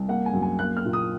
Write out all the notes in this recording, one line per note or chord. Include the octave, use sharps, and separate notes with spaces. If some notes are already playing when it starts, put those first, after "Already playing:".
Already playing: C2
A#3 F#5
G#5
F#2
G#5
A#3 F#6
F6
A#2
D#6